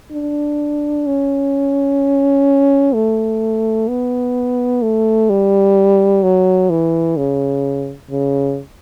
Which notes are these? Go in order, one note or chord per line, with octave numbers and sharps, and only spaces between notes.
D4
C#4
A3
B3
A3
G3
F#3
E3
C#3
C#3